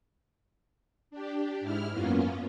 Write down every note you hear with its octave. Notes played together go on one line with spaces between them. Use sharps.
D4 G4
G#2 E4 F6
F#2 A#3 B3 C#4 F4